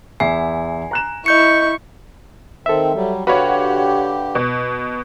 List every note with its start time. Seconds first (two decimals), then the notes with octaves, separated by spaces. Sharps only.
0.20 E2 E5 G#5 C7
0.91 A#5 F#6 E7
1.26 E4 D#5 C#6 G6 C#7
2.66 D#3 C4 A4 E5
2.95 F#3 G3
3.27 D3 F#4 G4 B4 C#5 F5 B5
4.35 B2